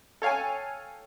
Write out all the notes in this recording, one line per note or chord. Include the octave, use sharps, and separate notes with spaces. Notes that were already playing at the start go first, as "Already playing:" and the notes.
A4 C#5 F5 G5 G#5